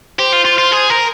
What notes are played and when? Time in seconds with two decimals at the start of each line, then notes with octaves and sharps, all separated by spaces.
0.19 G4 C5
0.33 F4
0.45 F4
0.58 F4
0.72 G#4
0.90 A#4